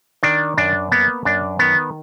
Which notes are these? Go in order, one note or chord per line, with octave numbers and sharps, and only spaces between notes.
D#3 D4
F#2 D4
A#3 B3
F#2 D4
D#3 B3